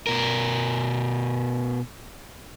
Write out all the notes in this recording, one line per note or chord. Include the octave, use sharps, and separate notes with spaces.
B2 A#4